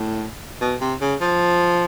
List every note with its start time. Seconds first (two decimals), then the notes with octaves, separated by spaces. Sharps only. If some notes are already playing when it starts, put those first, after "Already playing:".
Already playing: A2
0.61 B2
0.81 C3
1.01 C#3
1.21 F3